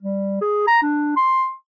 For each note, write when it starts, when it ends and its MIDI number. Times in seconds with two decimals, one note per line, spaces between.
0.03 0.36 55
0.41 0.65 68
0.67 0.81 82
0.83 1.12 62
1.16 1.50 84